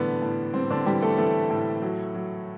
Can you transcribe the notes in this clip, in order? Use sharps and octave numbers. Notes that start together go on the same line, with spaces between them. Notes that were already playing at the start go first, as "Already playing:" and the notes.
Already playing: A2 D3 E3 G3 B3 D4
A2
G3 C4
D3 D4
E3 G3 G4
A3 A4
E3 A3 A4
A2
F#3
F#3